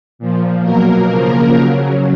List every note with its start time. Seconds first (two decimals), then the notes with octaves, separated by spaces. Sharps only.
0.19 A#2 F3
0.63 B2 F#3 A#3 A#4
1.08 C#3 F3
1.53 C#3 F#3